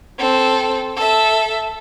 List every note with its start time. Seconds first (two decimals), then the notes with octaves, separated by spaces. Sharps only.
0.19 C4 A4
0.96 A4 E5